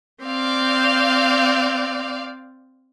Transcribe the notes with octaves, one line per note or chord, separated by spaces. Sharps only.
C4 D5 F5